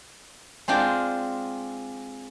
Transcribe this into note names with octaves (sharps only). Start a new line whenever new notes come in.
G#3 C4 D4 F4 G5